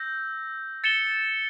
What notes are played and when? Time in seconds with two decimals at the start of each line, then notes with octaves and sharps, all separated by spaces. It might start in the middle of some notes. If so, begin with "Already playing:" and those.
Already playing: E6 G6 A#6
0.84 A6 C#7 E7 G7